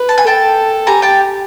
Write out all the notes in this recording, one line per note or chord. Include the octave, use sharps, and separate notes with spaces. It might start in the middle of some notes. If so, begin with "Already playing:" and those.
Already playing: B4
A5
G#5
A4 G5 A5
G4 G#5 A#5
G5 A5